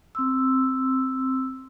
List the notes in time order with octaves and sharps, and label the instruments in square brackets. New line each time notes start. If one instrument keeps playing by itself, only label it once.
[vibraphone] C4 C6 E6